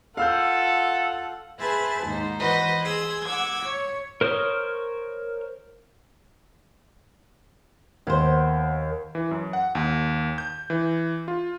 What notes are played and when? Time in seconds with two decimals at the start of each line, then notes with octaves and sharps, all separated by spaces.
0.17 F4 A4 F5 F#5 E6 G6
1.59 G#4 B4 C5 E5 G#5 A5
2.05 D#2 G#2 D#4 C5
2.39 E3 F#4 B4 C5 D#5 D#6
2.82 G#4 C6 D#6 E6
3.25 F#5 D6 E6 G#6
3.63 C#5
4.21 A#4 C5 C#5 D#6 F6
8.07 D#2 B3 C5
9.15 E3
9.31 F#2
9.53 F#5
9.75 D#2
10.38 G6
10.70 E3
11.28 F4